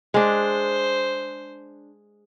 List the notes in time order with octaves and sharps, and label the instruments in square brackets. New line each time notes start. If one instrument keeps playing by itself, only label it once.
[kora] G#3 D4 [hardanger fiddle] C5